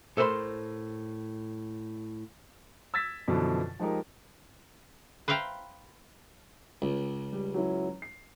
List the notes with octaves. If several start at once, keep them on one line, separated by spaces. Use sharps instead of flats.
A2 A4 A#4 C5 B5 C6
E6 G#6 A6 B6 E7
F#2 B2 D3 E3 F3
F3 G#3 D#4 G4 A#4
B4 C5 E5 F5 G5 A#5
C#2
G3
F#3 C#4 E4
C7